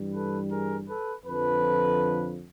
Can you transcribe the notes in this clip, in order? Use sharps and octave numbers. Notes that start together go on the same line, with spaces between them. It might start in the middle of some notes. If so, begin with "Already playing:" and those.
Already playing: G2 E3 G3
A4 B4
G#4 A#4
A4 B4
F2 D3 F3 A4 B4